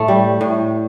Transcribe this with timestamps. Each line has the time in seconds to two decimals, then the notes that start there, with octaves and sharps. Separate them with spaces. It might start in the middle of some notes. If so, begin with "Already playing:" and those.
Already playing: A2 A3
0.08 G3
0.41 A2